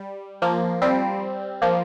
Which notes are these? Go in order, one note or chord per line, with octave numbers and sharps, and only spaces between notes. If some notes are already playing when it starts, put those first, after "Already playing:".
Already playing: G3
F3 A#3
G3 C4
F3 A#3